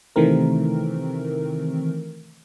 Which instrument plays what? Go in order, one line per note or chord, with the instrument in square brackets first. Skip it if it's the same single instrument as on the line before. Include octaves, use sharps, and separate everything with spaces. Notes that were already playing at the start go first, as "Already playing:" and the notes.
[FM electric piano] C3 D#3 E3 A3 C4 A#4